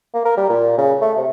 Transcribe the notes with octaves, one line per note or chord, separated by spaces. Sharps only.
A#3
A#4
G3
A#2
C#3
A3
C3